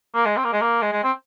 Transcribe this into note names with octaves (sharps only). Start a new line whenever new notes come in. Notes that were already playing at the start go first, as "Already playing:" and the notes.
A#3
G#3
C4
A#3
G#3
A#3
G#3
G#3
C4